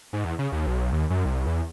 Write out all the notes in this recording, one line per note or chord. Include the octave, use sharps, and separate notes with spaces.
G#2
E2
C#3
D#2
B1
D#2
F#2
C2
E2